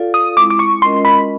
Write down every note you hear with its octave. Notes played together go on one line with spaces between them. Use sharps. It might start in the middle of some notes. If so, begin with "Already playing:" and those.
Already playing: F4 A4 D5 F5
D#6
G#3 C4 E4 D6
D6
C#6
G#3 C#4 F4 A#4 D#5 C6
B5